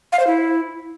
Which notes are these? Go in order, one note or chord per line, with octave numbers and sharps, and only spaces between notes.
F5
C5
E4